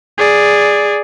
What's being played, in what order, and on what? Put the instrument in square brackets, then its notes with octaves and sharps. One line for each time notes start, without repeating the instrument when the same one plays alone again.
[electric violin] G#4 D5